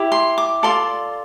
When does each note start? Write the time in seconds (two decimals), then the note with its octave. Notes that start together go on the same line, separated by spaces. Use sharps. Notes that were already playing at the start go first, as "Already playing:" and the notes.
Already playing: E4 G4
0.12 C6
0.38 D6
0.63 F4 A4 D5 C6